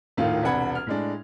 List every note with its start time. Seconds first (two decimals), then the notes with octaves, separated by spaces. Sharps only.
0.17 D#1 A2 D#3 F4 F5
0.43 E1 C2 D4 F#5 B5 G#6
0.75 F6
0.87 A2 G#3 D4